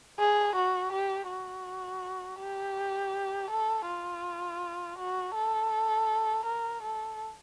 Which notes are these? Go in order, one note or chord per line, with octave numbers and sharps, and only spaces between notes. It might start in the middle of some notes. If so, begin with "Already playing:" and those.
G#4
F#4
G4
F#4
G4
A4
F4
F#4
A4
A#4
A4